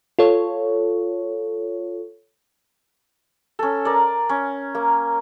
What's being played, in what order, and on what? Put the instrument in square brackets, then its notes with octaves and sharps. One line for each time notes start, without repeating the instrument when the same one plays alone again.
[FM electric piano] F4 A4 C#5
[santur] C#4 A4
A#4 D5
C#4
A#3